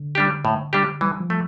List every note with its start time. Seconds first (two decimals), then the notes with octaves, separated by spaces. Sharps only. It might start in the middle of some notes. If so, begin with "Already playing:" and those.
Already playing: D3
0.15 G3 D4 G4
0.45 A2
0.73 G3 D4 G4
1.01 E3 G3
1.20 F3
1.30 A3